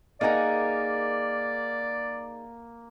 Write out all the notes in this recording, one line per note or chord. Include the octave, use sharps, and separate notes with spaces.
A#3 D#4 G#4 A#4 D5 F#5 A#5